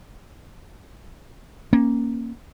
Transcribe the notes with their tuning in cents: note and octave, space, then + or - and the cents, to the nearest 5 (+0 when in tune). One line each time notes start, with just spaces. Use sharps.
A#3 +0 C#4 -20